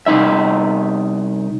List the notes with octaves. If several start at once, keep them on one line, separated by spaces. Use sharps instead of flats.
C2 D#4 E5